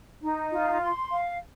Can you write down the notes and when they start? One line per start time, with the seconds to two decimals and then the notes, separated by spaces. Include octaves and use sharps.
0.22 D#4
0.52 F4
0.81 C6
1.10 F5